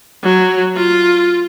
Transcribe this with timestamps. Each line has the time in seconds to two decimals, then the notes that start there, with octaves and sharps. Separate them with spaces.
0.23 F#3
0.76 F4